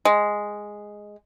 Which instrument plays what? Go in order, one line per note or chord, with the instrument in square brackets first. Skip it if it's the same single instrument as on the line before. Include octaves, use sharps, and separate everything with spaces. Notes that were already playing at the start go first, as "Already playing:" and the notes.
[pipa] G#3